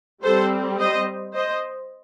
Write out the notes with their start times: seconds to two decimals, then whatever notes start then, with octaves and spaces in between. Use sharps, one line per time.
0.24 G3 C4 A4 C5
0.79 C5 D#5
1.34 C5 D#5